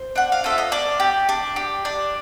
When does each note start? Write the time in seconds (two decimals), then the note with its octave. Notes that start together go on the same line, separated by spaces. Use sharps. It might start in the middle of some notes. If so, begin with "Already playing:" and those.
Already playing: C5
0.15 D4 F#5
0.32 F5
0.44 F4 A4 E5
0.58 D#5
0.72 D4 D5
1.00 G4
1.29 D4
1.56 G4
1.85 D4 D5